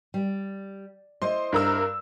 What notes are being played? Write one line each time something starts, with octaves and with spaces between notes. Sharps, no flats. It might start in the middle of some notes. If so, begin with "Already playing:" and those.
G3
E4 C5 D#5 C6
G2 A#4 E6